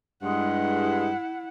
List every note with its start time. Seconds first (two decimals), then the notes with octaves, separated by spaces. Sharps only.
0.23 G2 G#3 E4 F#5